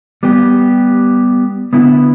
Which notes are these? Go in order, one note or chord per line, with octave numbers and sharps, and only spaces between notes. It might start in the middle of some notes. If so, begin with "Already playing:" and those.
G3 B3 G4
D3 B3 E4 B4